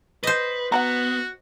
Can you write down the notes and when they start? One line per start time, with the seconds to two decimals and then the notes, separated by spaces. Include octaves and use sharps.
0.23 B4 C5 D#5
0.72 B3 F#4 F#5 A5 A#5